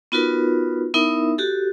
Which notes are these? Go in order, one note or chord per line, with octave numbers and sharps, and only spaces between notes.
B3 D#4 F4 F#4 A#4 B4
B3 D#4 E4 A#4 E5
F#4 G4 A4